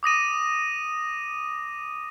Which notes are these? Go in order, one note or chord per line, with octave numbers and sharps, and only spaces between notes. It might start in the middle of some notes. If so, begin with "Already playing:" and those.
D6 D#6 A#6 D#7